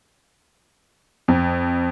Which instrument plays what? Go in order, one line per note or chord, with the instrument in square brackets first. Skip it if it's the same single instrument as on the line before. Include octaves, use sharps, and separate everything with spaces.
[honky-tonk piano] F2